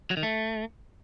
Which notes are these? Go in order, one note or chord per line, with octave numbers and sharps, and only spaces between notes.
F#3
D#3
A3